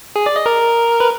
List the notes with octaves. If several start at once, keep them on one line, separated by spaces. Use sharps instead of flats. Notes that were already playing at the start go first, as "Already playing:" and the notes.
G#4
D5
D#5
A#4
B4